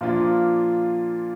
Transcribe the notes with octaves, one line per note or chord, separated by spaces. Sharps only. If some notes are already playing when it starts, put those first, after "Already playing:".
A#2 F3 A#3 D4 F4